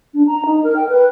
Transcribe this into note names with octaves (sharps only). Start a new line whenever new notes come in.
D4
A#5
D#4
A#4
G5
B4